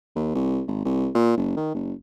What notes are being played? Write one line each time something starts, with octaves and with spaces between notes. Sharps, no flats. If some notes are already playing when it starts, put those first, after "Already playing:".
D#2
C2
G#1
C2
A#2
F#1
D#3
F#1